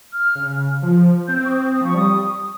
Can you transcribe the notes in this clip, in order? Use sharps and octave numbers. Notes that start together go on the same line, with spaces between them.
F6
C#3
F3
C4 G6
C#6
D#6
D#6
F3 C#6
G3 D#6